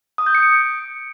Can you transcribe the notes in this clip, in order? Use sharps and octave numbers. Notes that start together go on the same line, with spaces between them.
D#6
G6
C#7
D7